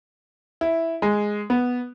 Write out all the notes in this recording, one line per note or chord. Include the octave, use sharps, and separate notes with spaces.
E4
G#3
B3